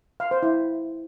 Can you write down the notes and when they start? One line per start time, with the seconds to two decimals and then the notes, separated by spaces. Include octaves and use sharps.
0.20 F5
0.31 C5
0.43 E4